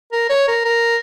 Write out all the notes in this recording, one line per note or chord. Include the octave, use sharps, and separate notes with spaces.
A#4
C#5
A#4
A#4